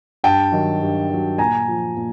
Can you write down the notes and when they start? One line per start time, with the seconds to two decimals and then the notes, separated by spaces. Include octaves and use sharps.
0.24 G2 G5 A5
0.52 D#3 F#3
0.82 G2
1.10 D#3 F#3
1.38 A#2 G#5 A#5
1.68 F3
1.97 A#2